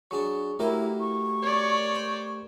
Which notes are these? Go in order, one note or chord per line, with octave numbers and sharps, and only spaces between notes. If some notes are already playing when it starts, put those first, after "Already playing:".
F#3 D4 G#4 C#6
F#3 A3 A#3 E4 G4 A#4 D6
C#6
C#5 D5
C5